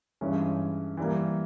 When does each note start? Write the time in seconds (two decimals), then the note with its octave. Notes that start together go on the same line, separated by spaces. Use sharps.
0.21 G2 E3 G#3 C#4
0.97 E3 G3 A#3